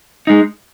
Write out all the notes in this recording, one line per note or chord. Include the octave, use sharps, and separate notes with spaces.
G#3 D#4